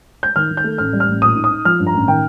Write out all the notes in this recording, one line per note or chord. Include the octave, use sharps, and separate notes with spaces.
G6
D#3 F6
D#3
G6
A3
A1 F6
G3
F6
A1
A#2 D#6
D#4
D#6
D#4
F3 F6
G2
A#5
A1
D#3 G5